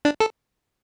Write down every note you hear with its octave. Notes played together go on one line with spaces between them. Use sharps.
D4
A4